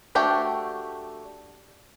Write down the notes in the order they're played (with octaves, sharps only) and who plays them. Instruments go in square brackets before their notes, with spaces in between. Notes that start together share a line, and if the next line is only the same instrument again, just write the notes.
[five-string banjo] A3 D4 F#4 G4 G5